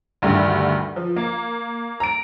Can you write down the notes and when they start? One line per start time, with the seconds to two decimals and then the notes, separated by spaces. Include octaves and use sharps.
0.22 D2 G2 D3 D#3
0.96 F3
1.16 A#3
2.00 A#5 D7